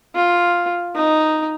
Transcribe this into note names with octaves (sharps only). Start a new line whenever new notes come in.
F4
D#4